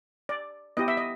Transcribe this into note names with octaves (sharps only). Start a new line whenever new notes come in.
D5
B3 E4 G4 D#5
E5
D#5